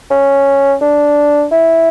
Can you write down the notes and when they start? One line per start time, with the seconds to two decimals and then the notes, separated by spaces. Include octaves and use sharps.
0.11 C#4
0.81 D4
1.51 E4